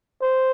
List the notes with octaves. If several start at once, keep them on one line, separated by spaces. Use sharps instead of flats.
C5